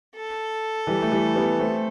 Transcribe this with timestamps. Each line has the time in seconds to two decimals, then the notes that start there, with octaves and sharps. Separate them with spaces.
0.15 A4
0.87 E3 G3
1.02 A3
1.11 E3 G3
1.35 G3 B3
1.60 A3 C4